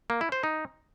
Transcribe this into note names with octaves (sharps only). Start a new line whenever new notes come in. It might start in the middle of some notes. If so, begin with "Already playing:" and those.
A#3
E4
C5
D#4